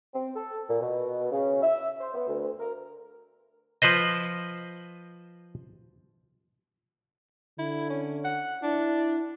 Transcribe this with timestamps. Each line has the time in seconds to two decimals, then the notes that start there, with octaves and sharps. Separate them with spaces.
0.14 C4
0.36 A4
0.69 A#2
0.81 B2
1.31 C#3
1.62 E5
2.00 C5
2.14 B3
2.27 D2
2.60 A#4
3.82 F3 B4 C5 D#5
7.59 D3 E4
7.90 C#4
8.25 F#5
8.63 D4 E4